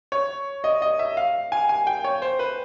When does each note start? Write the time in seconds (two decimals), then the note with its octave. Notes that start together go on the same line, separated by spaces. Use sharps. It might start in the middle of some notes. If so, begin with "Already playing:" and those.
0.12 C#5
0.64 D#5
0.82 D#5
0.99 E5
1.17 F5
1.52 G#5
1.69 G#5
1.87 G5
2.04 C#5
2.22 C5
2.39 B4